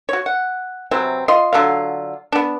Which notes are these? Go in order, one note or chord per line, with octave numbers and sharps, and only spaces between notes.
F#4 C#5
F#5
C3 E3 F#3 C4
F4 D#5 C6
D3 F#3 F4 F5
B3 D4